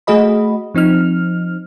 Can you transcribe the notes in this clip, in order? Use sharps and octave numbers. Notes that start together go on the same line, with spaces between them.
A3 F#4 G#4 D#5 B5
F3 C4 D#4 F6